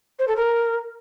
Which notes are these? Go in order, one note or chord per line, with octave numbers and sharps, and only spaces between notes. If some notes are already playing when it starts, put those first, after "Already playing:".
C5
A4
A#4